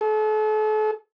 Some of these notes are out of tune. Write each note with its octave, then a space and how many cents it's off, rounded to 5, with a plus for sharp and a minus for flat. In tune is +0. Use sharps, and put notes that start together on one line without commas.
A4 -40